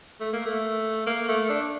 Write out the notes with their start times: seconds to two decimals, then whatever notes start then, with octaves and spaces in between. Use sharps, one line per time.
0.20 A3
0.33 A#3
0.45 A3
1.06 A#3
1.28 A3
1.49 D4